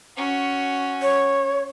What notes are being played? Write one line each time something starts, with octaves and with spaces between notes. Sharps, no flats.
C#4 F#4
C#5